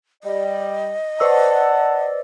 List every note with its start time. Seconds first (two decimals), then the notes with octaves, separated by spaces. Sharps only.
0.24 G3 D5 D#5
1.20 B4 C5 D5 F#5 A5 E6